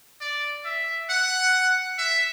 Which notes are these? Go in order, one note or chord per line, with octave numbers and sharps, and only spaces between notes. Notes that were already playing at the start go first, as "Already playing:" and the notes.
D5
E5
F#5
E5